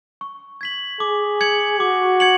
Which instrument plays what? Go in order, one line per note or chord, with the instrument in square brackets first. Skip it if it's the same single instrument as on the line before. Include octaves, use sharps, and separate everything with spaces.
[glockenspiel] C#6
G#6 B6 F#7
[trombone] G#4 [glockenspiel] D6
[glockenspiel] G#6 C#7 F#7
[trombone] F#4 [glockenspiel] D6
[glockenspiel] G#6 C#7 F#7